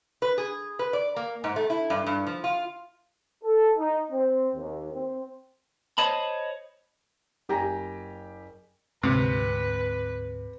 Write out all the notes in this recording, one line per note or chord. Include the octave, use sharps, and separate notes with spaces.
B4
G#4
B4
D5
A#3
G#2
A3
E4
G2
G2
F3
F4
A4
D#4
C4
D#2
C4
C5 C#5 D#5 A5 B5
F#1 G4 G5 G#5 A#5 A#6
D2 G#2 C3 B4